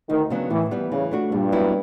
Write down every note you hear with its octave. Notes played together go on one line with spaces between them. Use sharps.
D2 D#3
C#3 F#3 B3 D4
A2 E3
E3 G3 B3
C#3 E3
A3 D4 F#4
G2 A#2
F#3 B3 E4